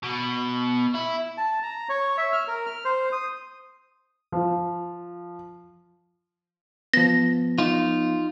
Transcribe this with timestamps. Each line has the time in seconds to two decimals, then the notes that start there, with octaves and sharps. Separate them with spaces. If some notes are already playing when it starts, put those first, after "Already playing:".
0.03 B2
0.94 E4
1.38 A5
1.63 A#5
1.89 C#5
2.18 E5
2.33 F6
2.48 A#4
2.66 F6
2.85 C5
3.12 D#6
4.32 F3
6.94 F3 B3 A#6
7.58 D#4 F4